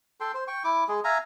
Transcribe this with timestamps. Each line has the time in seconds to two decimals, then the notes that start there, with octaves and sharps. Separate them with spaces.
0.20 A4 G5 C6
0.34 C5
0.48 G5 C#6
0.64 E4 D6
0.88 G#3 G#4
1.04 E5 F5 G#5 A#5